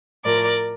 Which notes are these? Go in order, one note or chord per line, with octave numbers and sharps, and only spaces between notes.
A2 F3 A#4 D5